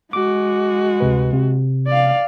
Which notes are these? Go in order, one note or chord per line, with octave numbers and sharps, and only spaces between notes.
G#3 F#4 D6
D2 C3 B4
C3
D5 F5